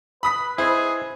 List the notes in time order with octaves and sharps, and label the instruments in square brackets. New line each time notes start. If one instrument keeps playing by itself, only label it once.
[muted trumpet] B4 [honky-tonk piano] B5 D#6 B6
[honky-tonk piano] C4 [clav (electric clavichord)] E4 C5 D#5 [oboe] G#4